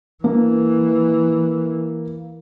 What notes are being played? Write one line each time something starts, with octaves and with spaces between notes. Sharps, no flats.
E3 A#3